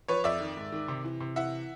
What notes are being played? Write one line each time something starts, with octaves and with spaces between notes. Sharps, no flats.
F3 B4 C#5
F2 D5 E5
D#3
G#2
D#3
C3
E3
C3
E3 E5 F#5